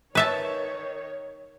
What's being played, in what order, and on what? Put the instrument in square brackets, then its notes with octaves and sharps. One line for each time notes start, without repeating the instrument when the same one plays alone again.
[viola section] D#3 C#5 [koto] B4 E5 A5